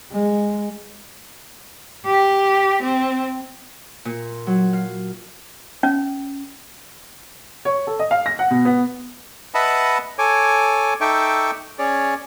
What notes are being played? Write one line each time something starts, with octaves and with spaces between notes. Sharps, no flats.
G#3
G4
C4
A#2
F#3
F5
C#4
C#5
A4
D#5
F5
A#6
F#5
B2
B3
B4 D#5 E5 F#5 A5 B5
A4 C#5 G#5 D6
D#4 A4 E5 G5 C#6 D6
C#4 G#4 C#5 D5